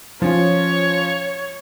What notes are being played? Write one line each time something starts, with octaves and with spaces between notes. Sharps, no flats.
F3 C#4 F4 C#5